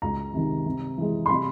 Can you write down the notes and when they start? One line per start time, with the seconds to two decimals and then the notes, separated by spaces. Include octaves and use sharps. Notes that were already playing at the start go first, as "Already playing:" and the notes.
0.02 C#2 A#5
0.34 C3 D#3
0.66 C3
0.98 E3 G#3
1.26 C6
1.29 C3 B5